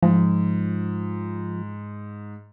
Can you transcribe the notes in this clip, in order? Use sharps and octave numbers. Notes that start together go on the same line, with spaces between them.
G#2 F3